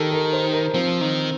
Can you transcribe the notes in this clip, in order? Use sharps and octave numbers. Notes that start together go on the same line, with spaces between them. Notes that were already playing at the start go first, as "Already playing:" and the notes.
Already playing: D#3 G4 A4 A#4
A#4
C5
A#4
F3 C4
D#3